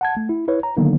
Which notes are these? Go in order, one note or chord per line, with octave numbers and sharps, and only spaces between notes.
F#5 A5 G#6
A3
E4
E4 B4 C#5
A#5
D3 D#3 F#3 A#3 B3 D#4